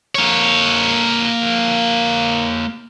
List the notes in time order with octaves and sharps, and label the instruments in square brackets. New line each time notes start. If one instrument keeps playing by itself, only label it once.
[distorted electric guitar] A#3 C#5